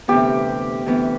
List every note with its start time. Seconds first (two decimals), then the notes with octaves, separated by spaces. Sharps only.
0.08 D2 C3 E3 B3 G4
0.86 D2 C3 E3 B3